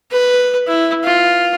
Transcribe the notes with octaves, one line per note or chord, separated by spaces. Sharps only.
B4
E4
F4